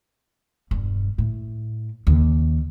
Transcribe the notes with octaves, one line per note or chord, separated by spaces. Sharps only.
E1 G2
A2
D#2 C#3